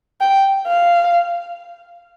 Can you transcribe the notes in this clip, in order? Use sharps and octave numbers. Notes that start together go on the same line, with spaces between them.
G5
F5